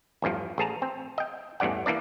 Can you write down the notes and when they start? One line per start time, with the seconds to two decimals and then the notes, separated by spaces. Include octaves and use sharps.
0.22 A1 E2 G2 F3
0.58 A1 G#4 A5 A#5
0.82 C4
1.18 D#5 G5
1.60 A1 E2 G2 D5 F#5
1.86 E3 A#3 D4 D5